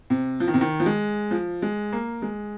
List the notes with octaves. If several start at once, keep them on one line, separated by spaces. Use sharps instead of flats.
C3
F3
D#3
C3
D#3
F3
G#3
F3
G#3
A#3
G#3